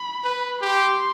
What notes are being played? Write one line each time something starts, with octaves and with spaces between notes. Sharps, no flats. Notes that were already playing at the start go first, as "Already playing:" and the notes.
Already playing: B5
B4
G4 C6